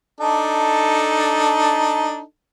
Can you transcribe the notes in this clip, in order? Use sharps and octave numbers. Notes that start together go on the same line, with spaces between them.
D4 D#4 A4